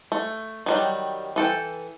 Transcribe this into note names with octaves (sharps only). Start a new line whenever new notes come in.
A3
D#3 F#3 G3
E3 A4 G5